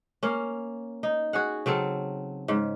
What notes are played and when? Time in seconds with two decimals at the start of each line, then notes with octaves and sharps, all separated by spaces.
0.23 A#3 C#4
1.03 D#4
1.33 F#4 G#4 F#5
1.66 C#3 F#3 C4 A4
2.48 G#2 C#3